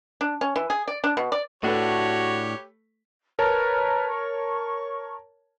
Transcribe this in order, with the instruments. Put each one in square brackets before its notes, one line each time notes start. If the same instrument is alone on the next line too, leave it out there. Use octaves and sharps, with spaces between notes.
[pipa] D4
C#4
E3
G#4
D5
D4
B2
D5
[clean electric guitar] A2 D4 [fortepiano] A3 A4 B4 [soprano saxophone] F#4 [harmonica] G4 C#5
[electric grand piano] A#4 C#5 A5 [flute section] B4 A#5 F6
[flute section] C#6